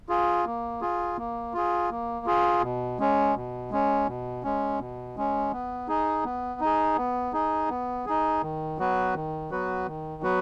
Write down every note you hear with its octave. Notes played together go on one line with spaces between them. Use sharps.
F4 G#4
A#3
F4 G#4
A#3
F4 G#4
A#3
F4 G#4
B2
G#3 C#4
B2
G#3 C#4
B2
G#3 C#4
B2
G#3 C#4
B3
D#4 G#4
B3
D#4 G#4
B3
D#4 G#4
B3
D#4 G#4
D#3
F#3 B3 F#4 B4
D#3
F#3 B3 F#4 B4
D#3
F#3 B3 F#4 B4